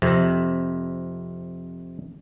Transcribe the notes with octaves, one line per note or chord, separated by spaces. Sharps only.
F2 C3